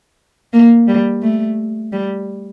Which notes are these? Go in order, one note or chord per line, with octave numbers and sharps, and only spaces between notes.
A#3
G3
A3
G3